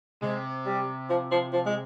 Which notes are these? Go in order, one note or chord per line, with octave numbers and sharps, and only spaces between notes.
C3 G#3
G3
F3
F3
F3
G#3